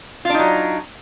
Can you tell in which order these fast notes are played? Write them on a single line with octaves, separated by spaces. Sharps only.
F4 D4 D#4 F#3